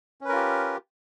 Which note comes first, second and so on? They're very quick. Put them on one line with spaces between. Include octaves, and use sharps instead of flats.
C#4 B4 A#4 F4 G4